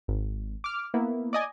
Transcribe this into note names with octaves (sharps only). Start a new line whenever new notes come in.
G#1
D6 F6
A#3 B3 E4
D5 D#5 G#5